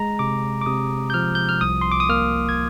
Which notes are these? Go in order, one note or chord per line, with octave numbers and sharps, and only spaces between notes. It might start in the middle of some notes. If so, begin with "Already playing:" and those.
Already playing: G#3 A#5
C3 D6
D6
C3 D#6
G6
F3 F6
G6
F6
C2 D#6
C6
D6
D#6
A#3 F6
G#6